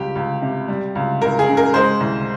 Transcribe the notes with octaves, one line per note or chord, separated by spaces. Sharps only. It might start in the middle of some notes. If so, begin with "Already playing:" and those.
Already playing: C#2 G3 G4
C#2
C3
G3
C#2
C#2 A#4
G#4
C#3
A#4
G#3 C5
C2